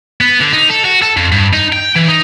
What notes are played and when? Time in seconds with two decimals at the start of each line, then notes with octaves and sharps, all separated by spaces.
0.21 B3
0.40 D3
0.52 D#4
0.69 A4
0.85 F#4
1.02 A4
1.17 F2
1.32 G2
1.53 D#4
1.73 G5
1.96 E3
2.09 D#4